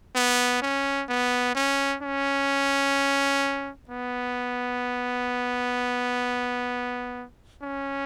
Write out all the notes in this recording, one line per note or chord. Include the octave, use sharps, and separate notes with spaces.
B3
C#4
B3
C#4
C#4
B3
C#4